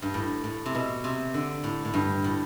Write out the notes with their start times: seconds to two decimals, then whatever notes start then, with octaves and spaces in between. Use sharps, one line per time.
0.02 G2
0.14 A2
0.44 A2
0.66 C3
0.75 B2
1.04 C3
1.34 D3
1.64 A2
1.85 A2
1.94 G2
2.24 A2